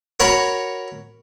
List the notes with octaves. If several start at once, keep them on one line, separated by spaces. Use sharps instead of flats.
F#4 A#4 C#5 B5